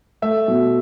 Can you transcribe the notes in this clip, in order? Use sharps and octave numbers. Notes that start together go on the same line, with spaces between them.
A3 E5
B2